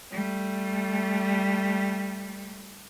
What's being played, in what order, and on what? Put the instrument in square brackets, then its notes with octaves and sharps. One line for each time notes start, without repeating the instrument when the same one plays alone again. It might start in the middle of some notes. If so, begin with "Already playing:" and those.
[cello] G3 A3